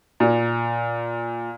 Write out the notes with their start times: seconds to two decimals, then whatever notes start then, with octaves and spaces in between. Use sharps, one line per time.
0.20 A#2